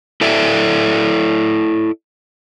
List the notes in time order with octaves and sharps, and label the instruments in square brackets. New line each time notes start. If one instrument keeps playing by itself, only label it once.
[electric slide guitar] E4 A4 D5 E5